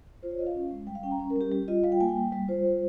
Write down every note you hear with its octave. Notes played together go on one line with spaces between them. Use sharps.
F4 C5
C#5
F4 D#5
F5
C#4
G#3
G3 G5
F5
C#4 G5
A#5
C#4
A#4
G3 G4
G3 G4
F4 D#5
G3 F5
G5
A#3 G#5
G5
G3
G3
F4 C5
G3